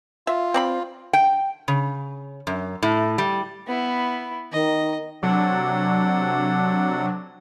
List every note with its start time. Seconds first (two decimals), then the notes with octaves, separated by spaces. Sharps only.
0.27 F4 E5
0.54 C4 D5 B5
1.13 G5
1.68 C#3
2.47 F#2
2.83 A2
3.18 G3
3.67 B3 E4
4.52 D#3 D#5
5.23 C3 F#3 D4 A4 F#5